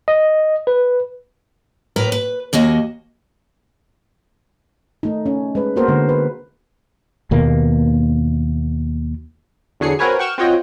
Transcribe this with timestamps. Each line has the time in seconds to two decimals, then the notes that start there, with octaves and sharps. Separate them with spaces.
0.08 D#5
0.67 B4
1.96 A2 A#4 B4 A#5
2.12 B4
2.53 D#2 A#3 F#4 D#5
5.03 A3 D#4
5.26 C#4
5.55 G#3 B4
5.76 A#3 B3 F#4 A#4 C5
5.88 D3 G#3
6.09 B4
7.31 D#2 B2 A#3
9.80 E2 D3 F#3 G#4 C7 C#7
9.99 C4 F#4 A#4 B4 C#5 G#5
10.19 F#5 G5 C#6 F6 E7
10.38 C4 F4 F#4 C#5 D#5 G5